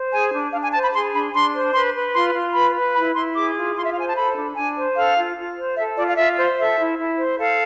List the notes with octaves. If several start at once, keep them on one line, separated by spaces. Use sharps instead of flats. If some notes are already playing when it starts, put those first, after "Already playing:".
Already playing: C5
G#4 G#5
D4
D4 F5
G#5
C5 A5
B5
G#4 C6
D4 B5
D4 C6
C5
B4 C6
B4
F4 C6
F4
B4 B5
B4
E4 B5
E4 C6
G#4 D6
F4
F4 C6
E5
F5
C5 G#5
A5
A4 B5
D4
D4 G#5
C5
A4 F5
F4
F4
C5
A4 E5
F4 D5
F5
F4 E5
C5
A4 E5
E4
E4
C5
A4 F5